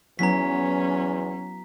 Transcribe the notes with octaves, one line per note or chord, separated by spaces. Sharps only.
E2 F#3 B3 C#4 E4 A#5 B6